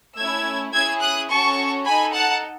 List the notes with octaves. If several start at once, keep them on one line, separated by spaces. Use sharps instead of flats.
A3 C#4 E4 E6 G#6
C#4 E4 G#4 E6 G#6
D#6 F#6
C#4 F#4 A4 A5 C#6
D#4 A4 G#5 B5
F#5 A5